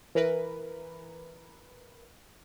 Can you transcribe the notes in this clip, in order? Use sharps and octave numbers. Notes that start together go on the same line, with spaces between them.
E3 A#4 B4